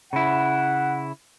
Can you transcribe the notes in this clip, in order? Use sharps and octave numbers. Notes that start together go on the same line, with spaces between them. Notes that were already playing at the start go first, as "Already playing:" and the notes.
C#3 E4 F#5